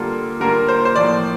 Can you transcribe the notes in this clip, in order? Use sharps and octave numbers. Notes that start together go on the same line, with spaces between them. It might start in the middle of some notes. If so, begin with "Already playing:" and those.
Already playing: D3 G3 A#3 F4 A4
D3 G3 A#3 F4 A#4
C5
C5
A2 F3 A#3 F4 D5